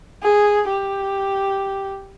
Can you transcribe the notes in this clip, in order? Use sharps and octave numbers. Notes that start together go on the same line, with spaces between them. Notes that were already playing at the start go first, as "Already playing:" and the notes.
G#4
G4